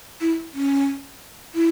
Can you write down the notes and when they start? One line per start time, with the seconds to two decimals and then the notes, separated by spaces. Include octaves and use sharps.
0.21 E4
0.54 C#4
1.55 E4